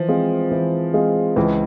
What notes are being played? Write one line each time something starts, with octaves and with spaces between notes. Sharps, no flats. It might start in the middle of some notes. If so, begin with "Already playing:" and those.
Already playing: E3 F3
G#3 C4 F4 G#4
E3
G#3 C4 F4 G#4
C#2 E3